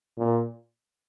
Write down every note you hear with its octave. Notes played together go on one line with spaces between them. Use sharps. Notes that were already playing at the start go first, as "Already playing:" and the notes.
A#2